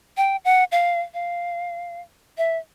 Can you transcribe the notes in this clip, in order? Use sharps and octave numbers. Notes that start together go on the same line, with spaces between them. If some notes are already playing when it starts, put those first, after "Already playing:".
G5
F#5
F5
F5
E5